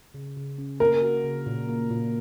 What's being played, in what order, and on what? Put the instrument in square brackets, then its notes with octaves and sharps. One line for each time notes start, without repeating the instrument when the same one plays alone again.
[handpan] C#3
C#3
C#4
[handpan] A#3 [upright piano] A#4
[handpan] F#4
C#3
A#2
A#3
A#2